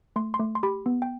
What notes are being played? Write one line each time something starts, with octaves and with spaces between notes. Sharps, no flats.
A3 C6
C6
A3
C6
G4 B5
B3
G5